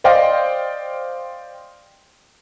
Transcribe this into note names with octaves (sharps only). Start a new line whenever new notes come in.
C5 D5 D#5 F5 G5 C6